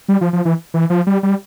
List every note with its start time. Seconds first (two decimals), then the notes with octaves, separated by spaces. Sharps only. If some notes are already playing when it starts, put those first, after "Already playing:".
0.09 G3
0.21 F3
0.33 F3
0.45 E3
0.74 E3
0.90 F3
1.07 G3
1.23 G3